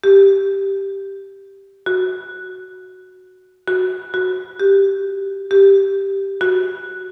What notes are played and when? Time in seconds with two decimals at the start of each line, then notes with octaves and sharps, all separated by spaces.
0.04 G4
1.86 F#4
3.68 F#4
4.14 F#4
4.60 G4
5.51 G4
6.41 F#4